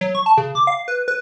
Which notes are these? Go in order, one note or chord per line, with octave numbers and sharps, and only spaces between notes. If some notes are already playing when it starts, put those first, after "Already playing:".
F#3
C#6
A5
C#3
D6
F5
B4
B4